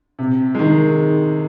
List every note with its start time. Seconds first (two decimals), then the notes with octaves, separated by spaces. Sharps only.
0.19 C3
0.55 D#3 G#3